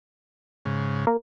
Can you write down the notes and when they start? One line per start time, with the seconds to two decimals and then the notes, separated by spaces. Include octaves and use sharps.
0.65 G#2 C#3
1.07 A#3